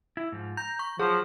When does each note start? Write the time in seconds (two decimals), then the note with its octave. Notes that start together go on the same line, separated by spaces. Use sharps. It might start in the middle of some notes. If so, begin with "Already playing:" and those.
0.17 E4
0.32 G#2 F3
0.57 A#5 G6
0.79 C#6
1.00 F3 F#3 G#4